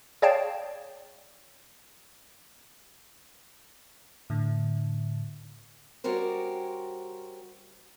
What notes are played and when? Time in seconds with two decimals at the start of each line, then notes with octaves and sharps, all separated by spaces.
0.22 G#4 C#5 D5 F5 G5 A5
4.30 A2 D3
6.04 G3 C#4 F#4 G4 A#4 C5